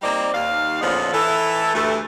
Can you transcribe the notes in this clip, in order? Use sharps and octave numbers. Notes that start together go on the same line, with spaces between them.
G3 A#3 C4 D#4 C5 D5
D#2 F5
E2 A#2 D3 F3 C#4 D#5
E3 A4
D2 G2 E3 A3